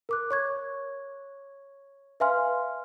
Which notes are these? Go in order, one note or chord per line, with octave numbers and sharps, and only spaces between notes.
A#4 D6 F#6
C#5 C#6 G#6
B4 E5 F5 G#5 C6 F6